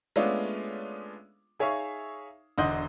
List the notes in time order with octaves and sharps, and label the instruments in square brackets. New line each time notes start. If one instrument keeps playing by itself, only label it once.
[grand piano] G#3 A3 B3 C#4 D4 F4
D#4 G#4 C#5 E5 F5 C#6
E1 D3 D#5 F#5 C6 G6